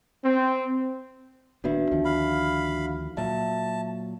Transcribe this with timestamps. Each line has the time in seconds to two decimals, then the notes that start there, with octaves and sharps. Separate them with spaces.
0.24 C4
1.64 D#1 D#2 B3 D4 F#4 E5
1.91 D2 D#3 F3
2.05 F5 B5
3.17 A#2 F#3 E5 A5